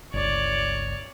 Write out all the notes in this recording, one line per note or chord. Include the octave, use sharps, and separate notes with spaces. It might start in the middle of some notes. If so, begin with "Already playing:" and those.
G1 C#2 C#5 D5